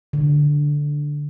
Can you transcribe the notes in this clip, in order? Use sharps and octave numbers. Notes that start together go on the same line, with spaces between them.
D3